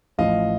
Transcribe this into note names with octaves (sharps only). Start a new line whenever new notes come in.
A1 A2 F3 D#5 F5